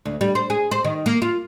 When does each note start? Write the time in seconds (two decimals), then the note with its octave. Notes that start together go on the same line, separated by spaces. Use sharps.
0.05 D2
0.21 G3
0.35 C5
0.50 G#4
0.71 C5
0.84 D#3
1.06 A#3
1.22 F4